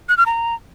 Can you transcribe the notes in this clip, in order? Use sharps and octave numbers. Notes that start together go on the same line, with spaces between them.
F#6
F6
A#5